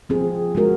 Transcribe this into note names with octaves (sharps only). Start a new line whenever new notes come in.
F3 C4 F4 G#4
G#3 C4 F#4 A#4